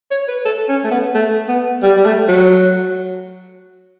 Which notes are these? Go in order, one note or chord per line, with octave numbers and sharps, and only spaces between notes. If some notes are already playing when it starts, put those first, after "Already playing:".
C#5
B4
A4
C#4
A3
B3
A3
B3
G3
G3
A3
F#3